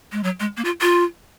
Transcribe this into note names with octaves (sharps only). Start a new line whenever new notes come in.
G#3
F#3
G#3
A#3
F4
F4